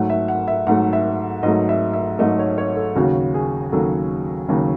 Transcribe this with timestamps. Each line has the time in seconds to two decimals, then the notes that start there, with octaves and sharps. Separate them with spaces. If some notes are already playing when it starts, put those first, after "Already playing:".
Already playing: G#2 F#3 A3 F#5
0.10 E5
0.28 F#5
0.48 E5
0.67 G#2 F#3 A3 F#5
0.93 E5
1.43 G#2 F#3 A3 D#5
1.69 E5
1.93 E5
2.19 G#2 F#3 A3 D#5
2.39 C#5
2.58 C#5
2.76 A4
2.95 D#2 C#3 F#3 F#4
3.34 G#4
3.72 D#2 C#3 F#3 A4
4.49 D#2 C#3 F#3